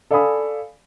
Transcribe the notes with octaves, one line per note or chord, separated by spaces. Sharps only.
A4 D5 F5 G#5 B5 D#6